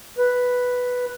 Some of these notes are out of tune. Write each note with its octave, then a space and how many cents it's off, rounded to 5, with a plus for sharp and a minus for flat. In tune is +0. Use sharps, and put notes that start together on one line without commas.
B4 +0